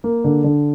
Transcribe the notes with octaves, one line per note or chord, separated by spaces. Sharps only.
A#3
D3
D3